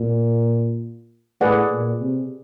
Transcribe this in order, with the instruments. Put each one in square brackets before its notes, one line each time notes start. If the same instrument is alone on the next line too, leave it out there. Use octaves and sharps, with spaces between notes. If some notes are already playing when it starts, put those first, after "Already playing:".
Already playing: [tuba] A#2
[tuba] A2 [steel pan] G#4 B4 D5 F#5
[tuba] A#2
C3